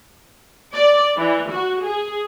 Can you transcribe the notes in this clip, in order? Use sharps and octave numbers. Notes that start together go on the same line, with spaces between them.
D5
E3
F#4
G#4